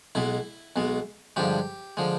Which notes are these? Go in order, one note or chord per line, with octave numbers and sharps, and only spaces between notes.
B1 B2 G#3 E4
B1 B2 G#3
G2 D3 F3 G#3 G4
D3 F3 G#3